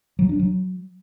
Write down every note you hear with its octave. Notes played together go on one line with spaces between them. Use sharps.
F#3
D4
F#3